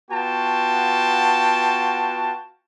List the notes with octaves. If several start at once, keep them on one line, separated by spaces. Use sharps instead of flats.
B3 F4 F#4 G5 A5